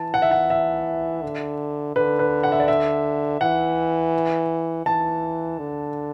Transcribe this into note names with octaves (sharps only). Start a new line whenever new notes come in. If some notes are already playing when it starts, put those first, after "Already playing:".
Already playing: E3 A5
F#5
E5
F#5
E5
D3
D3 B4
B4
F#5
E5
D5
E5
E3 F#5
E3 A5
D3